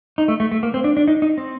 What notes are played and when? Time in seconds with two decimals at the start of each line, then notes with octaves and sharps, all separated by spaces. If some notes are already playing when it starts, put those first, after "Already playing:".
0.18 D#4
0.28 A3
0.40 A3
0.52 A3
0.63 A#3
0.74 C4
0.84 D4
0.97 D4
1.08 D#4
1.22 D#4
1.38 C4